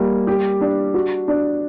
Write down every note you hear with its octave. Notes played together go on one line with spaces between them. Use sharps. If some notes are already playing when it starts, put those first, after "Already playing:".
Already playing: G3 A#3
G4
D4
F#4
D4